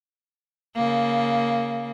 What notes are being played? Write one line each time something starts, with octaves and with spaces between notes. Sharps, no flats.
C#3 A#3